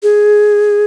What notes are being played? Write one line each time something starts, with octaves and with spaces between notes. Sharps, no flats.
G#4